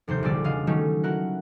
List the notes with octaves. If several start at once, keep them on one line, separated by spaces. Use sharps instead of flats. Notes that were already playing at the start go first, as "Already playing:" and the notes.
F1 D#2 C3 C5 G6
A#1 D3 G3 D5 E6 A6
E1 C#3 D4 D#5 F5
D#3 F#3 G3 A3 C#4 D#4
E4 F#4 A#4 F#5